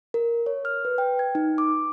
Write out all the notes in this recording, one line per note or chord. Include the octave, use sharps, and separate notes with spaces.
A#4
C#5
F6
B4
G5
G#6
D#4
D6